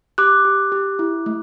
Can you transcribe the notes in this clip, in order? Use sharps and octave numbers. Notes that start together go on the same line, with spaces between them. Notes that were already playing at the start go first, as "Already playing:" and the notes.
G4 D6 F#6
G4
G4
E4
A3